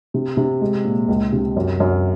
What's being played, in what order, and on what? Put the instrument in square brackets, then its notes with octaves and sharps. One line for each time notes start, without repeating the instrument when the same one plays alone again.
[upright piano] C3
C3
G#3
A#2
C#2
C3
F#2
F#2